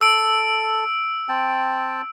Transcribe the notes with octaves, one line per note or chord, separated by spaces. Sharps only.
A4 E6 D7
C4 G5 A5